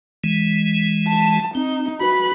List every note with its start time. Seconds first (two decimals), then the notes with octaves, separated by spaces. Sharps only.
0.24 E3 G#3
1.08 A5
1.55 C4 D#4
2.01 F#4 B4 B5